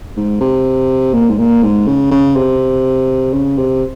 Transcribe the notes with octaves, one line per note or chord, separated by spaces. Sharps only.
G#2
C3
A#2
G#2
A#2
G#2
C#3
C#3
C3
C#3
C3